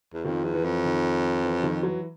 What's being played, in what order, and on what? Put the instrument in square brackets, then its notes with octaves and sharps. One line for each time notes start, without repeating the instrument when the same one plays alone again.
[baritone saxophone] E2
[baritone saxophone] F2 [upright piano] D#3 F3
[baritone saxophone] E2
[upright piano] E3
[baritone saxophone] F2
[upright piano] D#3
E3
D#3 F3
E3 F#3